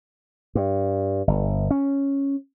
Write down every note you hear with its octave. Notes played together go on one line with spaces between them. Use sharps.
G2
G1
C#4